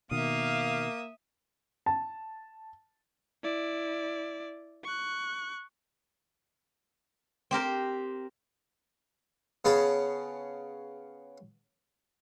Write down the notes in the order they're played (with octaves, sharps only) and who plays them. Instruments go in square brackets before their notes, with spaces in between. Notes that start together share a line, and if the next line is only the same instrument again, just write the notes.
[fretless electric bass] B2 D#3 [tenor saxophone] A#3 [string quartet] E5 D#6 [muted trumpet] F5
[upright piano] A5
[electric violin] E4 D5
C#6 F#6
[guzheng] C4 G4 A#4 C5
[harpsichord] C#3 B3 C#4 G#4 A5